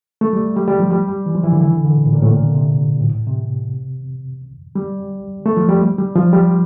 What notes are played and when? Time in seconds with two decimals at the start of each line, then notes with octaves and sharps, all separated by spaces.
0.21 A3
0.33 G3
0.56 G3
0.68 G3
0.79 F3
0.91 G3
1.08 G3
1.26 E3
1.35 F3
1.44 E3
1.52 D3
1.61 E3
1.72 D3
1.84 D3
1.96 A#2
2.05 A2
2.13 A#2
2.22 A2
2.31 A#2
2.43 D3
2.54 C3
3.01 A2
3.27 C3
4.75 G3
5.46 A3
5.57 F3
5.69 G3
5.98 G3
6.15 F3
6.33 G3